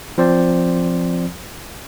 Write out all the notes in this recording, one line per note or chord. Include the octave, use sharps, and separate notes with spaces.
F3 C4 C5 D5